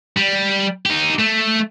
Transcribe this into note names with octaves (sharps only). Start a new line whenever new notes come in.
G3
D#4 G4
A3